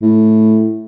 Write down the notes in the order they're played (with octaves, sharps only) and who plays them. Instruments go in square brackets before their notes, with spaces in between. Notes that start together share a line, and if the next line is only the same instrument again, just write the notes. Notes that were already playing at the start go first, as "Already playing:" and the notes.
[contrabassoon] A2